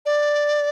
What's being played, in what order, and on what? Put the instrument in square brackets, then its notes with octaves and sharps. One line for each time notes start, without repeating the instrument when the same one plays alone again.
[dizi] D5